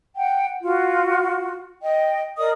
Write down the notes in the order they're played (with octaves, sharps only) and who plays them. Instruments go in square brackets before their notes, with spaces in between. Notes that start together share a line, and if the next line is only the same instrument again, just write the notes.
[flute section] F#5 G5
F4 F#4
D#5 G5
A#4 D5 D#5 D#6